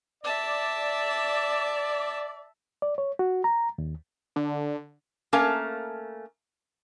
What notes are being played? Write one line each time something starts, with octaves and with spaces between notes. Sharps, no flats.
D5 E5 A5
D5
C#5
F#4
A#5
D#2
D3
A3 A#3 C#4 A#4 F5 A5